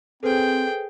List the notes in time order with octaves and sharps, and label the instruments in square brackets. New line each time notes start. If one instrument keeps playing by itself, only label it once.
[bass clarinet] C4 [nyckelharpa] G#4 G5 [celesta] A4 B4 C5